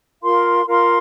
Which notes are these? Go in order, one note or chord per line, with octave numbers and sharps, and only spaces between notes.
F4 A#4 F5 C6
F4 A#4 F5 C6